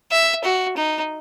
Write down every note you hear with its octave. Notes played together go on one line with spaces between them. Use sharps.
E5
F#4
D#4